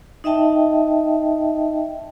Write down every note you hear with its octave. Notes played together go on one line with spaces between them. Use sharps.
D#4 D#5 E5 G5 A5